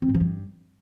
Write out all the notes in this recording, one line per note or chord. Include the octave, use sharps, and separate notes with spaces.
C4
G#2
F3
G2